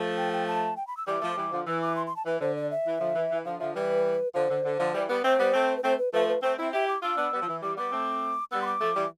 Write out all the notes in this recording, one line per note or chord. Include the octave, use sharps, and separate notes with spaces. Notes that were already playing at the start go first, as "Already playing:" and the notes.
Already playing: F3 A3
G5
G5
A5
G5
B5
E6
E3 G3 D6
F3 A3
E3 G3
D3 F3
E3 E6
D6
C6
C6
A5
E3 B4
D3 C5
D5
E5
E3
D3 F3
E3
E3
D3 F3 F5
D3 F3 E5
E3 G3 B4
D3 F3 C5
D3
D3
D3 F3
E3 G3
G3 B3
A3 C4 C5
G3 B3
A3 C4
B4
A3 C4 C5
B4
F3 A3 B4
B4
A3 C4 C5
C4 E4 E5
E4 G4 E5
D6
D4 F4 E6
B3 D4
G3 B3
F3
E3
E3 G3 D6
G3 B3 D6
A3 C4
G3 B3 E6
C6
D6
F3 A3
E3 G3